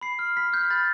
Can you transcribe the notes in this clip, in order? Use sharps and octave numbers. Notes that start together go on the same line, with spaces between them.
B5 C7
F6
B5 B6
F6 G6
B5 A6